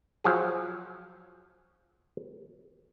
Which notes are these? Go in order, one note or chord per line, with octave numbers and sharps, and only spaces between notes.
F3 F#3 G#4